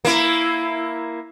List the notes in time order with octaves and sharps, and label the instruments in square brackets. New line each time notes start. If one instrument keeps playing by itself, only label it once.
[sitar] A#3 E4